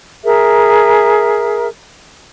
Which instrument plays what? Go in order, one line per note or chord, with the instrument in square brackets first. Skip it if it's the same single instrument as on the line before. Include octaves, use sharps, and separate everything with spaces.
[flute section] G#4 A#4 E5